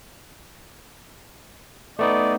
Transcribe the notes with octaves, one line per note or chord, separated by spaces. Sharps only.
A3 B3 D#4 D5